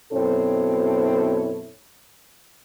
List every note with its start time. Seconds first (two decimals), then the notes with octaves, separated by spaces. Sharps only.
0.13 F#2 B2 C4 E4 A4 C#5